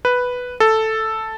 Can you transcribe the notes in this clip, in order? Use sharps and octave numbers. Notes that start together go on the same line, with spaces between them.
B4
A4